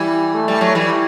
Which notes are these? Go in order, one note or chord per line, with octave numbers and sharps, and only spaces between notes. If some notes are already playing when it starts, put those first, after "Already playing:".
Already playing: E3 G3
A3
G3
F#3
E3 G3